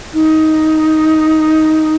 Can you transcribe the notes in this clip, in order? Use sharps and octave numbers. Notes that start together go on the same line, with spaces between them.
D#4